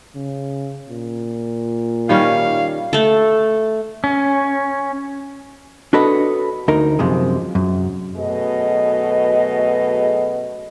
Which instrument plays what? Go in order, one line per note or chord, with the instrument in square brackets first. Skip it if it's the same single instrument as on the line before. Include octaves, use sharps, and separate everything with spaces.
[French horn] C#3
A#2
[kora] D#3 G3 C#4 [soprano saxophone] F5
[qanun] A3 A4
[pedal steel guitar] C#4
[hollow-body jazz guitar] D4 F#4 A4 B4 C#5 D#5
D2 D#4 A#4
F#2 C3 F3 G#3
F#2
[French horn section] F#2 B2 A3 G#4 B4 D#5